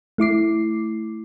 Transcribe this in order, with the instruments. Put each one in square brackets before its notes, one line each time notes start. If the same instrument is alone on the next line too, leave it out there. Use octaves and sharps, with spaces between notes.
[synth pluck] A3 E4 D6 C7